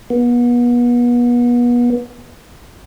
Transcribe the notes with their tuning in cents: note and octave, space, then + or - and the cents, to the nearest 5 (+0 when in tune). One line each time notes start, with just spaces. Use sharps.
B3 -35